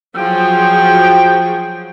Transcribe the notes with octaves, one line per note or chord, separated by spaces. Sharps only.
F3 F#3 G#4 G5